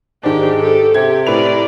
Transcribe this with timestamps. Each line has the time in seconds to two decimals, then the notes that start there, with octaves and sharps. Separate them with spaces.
0.23 G#2 D#3 D4 G4
0.57 G4 A4
0.94 C3 G4 G#6
1.27 A2 A#4 B4 D5 F7